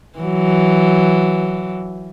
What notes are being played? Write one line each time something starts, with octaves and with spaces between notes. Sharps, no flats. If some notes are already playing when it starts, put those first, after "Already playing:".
E3 F#3